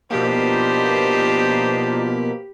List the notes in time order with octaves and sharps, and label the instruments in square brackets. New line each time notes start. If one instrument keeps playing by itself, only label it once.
[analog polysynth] B2 F3 A#3 [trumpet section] D4 D#4 C5 [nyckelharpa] G4 B5